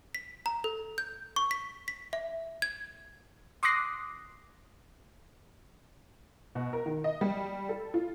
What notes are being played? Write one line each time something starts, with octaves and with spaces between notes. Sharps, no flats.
B6
A#5
A4
G6
C#6
B6
B6
E5
G#6
C6 D6 D#6 F#6 A#6 C7
B2
A#4
D#3
D#5
G3
A4
F4